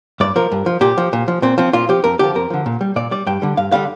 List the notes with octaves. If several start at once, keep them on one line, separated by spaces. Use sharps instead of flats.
G2 D5
F3 A#4
G2
F3
A#2 G4
F3
A#2
F3
A#2 C4
F3 C4
A#2 F4
F3 G4
F2 A#4
D3 F3 G4
F2 A#4
D3 F3
A#2
G3
A#2 D5
G3 D5
G2 G5
D3 G3
G2 F5
D3 G3 F5